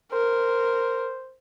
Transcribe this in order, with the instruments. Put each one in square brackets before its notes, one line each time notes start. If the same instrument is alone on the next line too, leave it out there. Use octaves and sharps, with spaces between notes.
[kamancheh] A#4 [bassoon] C5